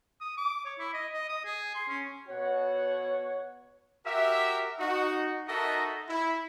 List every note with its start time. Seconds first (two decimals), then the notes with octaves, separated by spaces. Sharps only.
0.21 D#6
0.37 D6
0.65 C#5
0.79 E4
0.94 D#5
1.13 D#5
1.29 D#6
1.45 G#4
1.75 C6
1.89 C#4
2.29 B2 F#4 C#5 F#5
4.05 F#4 G4 A#4 E5
4.79 D#4 F#4
5.48 D#4 F#4 A4 A#4 D#5 E5
6.09 E4